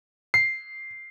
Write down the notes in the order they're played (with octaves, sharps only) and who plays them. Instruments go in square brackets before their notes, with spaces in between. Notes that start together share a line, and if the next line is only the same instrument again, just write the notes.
[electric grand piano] C7